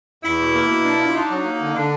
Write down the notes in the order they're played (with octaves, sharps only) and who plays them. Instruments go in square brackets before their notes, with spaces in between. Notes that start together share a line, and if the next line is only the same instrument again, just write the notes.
[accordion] E2 [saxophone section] E4
[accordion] B2
A#3
B2
D4
F4
[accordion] D4 [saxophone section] D#4
[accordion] F#3
A#3
D3
[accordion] D3 [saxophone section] D4